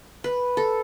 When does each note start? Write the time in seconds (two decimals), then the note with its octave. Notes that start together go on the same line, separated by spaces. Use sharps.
0.24 B4
0.57 A4